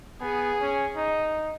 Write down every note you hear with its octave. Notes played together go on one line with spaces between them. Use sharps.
B3 G#4
C#4
D#4